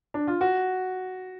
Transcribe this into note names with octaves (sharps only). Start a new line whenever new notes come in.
D4
F4
F#4